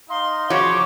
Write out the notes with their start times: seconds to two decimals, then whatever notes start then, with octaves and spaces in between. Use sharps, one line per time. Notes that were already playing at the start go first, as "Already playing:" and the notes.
0.10 D#4 D#5 F5 C6
0.50 C#3 F3 A3 F#4 C#5 D6